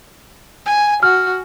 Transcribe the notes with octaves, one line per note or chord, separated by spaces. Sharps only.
G#5
F#4 F6